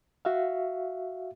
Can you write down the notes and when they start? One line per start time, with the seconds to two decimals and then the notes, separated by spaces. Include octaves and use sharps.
0.25 F#4 E5 F5